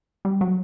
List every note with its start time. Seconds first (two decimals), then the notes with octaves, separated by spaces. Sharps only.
0.25 G3
0.41 F#3